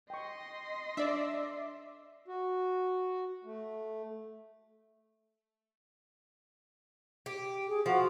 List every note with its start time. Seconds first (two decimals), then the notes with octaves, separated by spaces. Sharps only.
0.10 D#5 G5 C6 C#6
0.97 D4 D5 E5 E6
2.26 F#4
3.44 A3
7.26 G4
7.68 G#4
7.86 F3 F#4